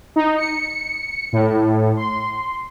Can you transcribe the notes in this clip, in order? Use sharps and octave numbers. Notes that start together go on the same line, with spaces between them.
D#4
C#7
A2
C6